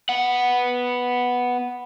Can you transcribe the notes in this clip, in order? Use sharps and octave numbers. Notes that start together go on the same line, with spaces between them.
B3 F#5